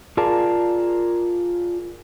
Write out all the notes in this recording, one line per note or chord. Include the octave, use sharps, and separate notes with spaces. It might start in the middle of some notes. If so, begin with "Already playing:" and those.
F4 G#4 A#4 D5 A5